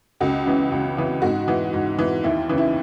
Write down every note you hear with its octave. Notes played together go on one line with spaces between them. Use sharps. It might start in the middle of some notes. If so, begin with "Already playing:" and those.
C#2 F#4
C#3 E3
C#2
C#3 E3
G#2 F#4
E3
G#2
E3
D#2 E4
C#3 E3
E4